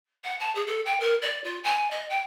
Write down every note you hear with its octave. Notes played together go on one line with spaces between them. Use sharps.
F#5
A5
G#4
A4
G5
A#4
D5
F4
G#5
D#5
G5